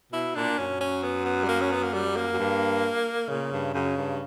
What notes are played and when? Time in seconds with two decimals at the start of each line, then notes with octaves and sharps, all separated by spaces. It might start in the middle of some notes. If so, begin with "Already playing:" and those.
0.12 B2 E4
0.35 A#2 D4
0.58 F#2 C#4
0.81 C#4
1.03 B3
1.25 B3
1.44 G3
1.48 A#3
1.61 C#4
1.72 B3
1.83 A#3
1.94 G3
2.16 A#3
2.33 F#2
2.39 G2
3.29 A#2 C#3
3.52 G2
3.74 F#2 C#3
3.97 G2